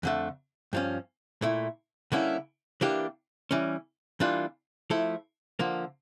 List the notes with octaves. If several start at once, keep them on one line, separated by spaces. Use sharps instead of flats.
F2 D3 A3
G2 F3 C#4
A#2 A3 E4
D3 G3 A#3 C#4 E4
E3 A#3 D4 G4
E3 G3 C#4
E3 G3 A#3 D4 F4
F3 A3 E4 A4
D3 F3 A#3